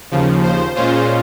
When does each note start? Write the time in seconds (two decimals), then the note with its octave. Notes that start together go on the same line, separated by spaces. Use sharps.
0.11 D#2 C#3 F3
0.43 C5
0.75 A#2 G#3 C#4 F4 C5